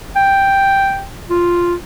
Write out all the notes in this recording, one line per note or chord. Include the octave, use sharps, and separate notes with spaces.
G5
F4